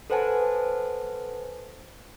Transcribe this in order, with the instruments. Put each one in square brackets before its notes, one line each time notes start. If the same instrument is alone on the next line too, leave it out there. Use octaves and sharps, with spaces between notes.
[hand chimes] A4 B4 C5 F#5 G#5 A5